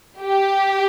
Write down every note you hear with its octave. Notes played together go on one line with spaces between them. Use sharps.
G4